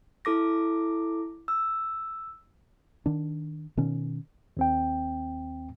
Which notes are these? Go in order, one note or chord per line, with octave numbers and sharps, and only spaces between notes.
E4 A4 D6 A#6
E6
D#3 D4
B2 D#3 C#4
D#2 C4 G5